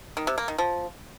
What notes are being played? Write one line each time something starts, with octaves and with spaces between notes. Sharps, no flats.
D#3
C3
A#3
D#3
F3